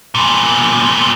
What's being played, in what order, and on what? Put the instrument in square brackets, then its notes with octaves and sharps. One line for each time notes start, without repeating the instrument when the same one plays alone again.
[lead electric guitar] E2 A#2